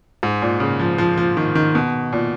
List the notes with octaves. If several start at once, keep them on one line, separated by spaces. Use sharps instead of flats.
G#2
A#2
C#3
F3
F3
F3
D#3
D#3
B2
A#2